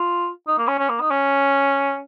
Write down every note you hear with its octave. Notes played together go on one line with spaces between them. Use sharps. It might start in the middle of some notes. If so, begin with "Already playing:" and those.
Already playing: F4
D#4
A#3
C#4
C#4
A#3
D#4
C#4